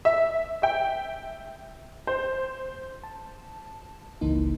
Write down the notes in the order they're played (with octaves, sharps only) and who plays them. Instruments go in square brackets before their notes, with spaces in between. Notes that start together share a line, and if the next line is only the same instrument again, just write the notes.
[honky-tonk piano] E5
E5 G5
C5
[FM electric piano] A5
G1 C#2 E3 A#3 D#4